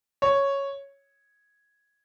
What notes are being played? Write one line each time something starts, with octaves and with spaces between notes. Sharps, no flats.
C#5